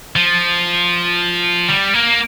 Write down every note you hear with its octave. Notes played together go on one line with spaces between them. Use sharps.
F3
G3
A#3